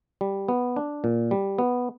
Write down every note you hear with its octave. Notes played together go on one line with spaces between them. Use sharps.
G3
B3
D4
A#2
G3
B3